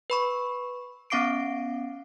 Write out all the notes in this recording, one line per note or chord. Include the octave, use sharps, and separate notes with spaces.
B4 B5 C#6
B3 C#4 F5 D6 C7 D7